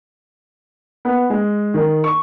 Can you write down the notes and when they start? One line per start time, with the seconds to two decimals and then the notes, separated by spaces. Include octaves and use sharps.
1.05 B3
1.30 G#3
1.74 D#3
2.04 C#6